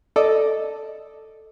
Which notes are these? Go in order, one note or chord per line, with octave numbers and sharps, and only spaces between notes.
A4 D5 D#5